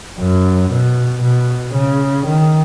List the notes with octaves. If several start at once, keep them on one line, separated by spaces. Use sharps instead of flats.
F#2
B2
B2
C#3
D#3